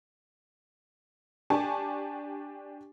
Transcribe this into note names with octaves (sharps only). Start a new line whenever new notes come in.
D4 G4 D5 G#5 A5 C#6